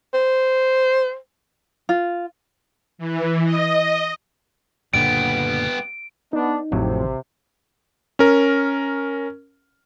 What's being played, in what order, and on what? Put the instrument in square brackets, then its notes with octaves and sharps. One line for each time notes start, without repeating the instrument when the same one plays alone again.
[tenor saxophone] C5
[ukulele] F4
[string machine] E3
D#5
[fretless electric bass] F#1 A#2 D3 [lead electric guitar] G3 B3 [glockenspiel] D7
[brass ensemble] B3 D4 [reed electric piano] D#4
[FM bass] A1 [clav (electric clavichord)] F2 A2 F#3 [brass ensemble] C3
[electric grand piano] C#4 A#4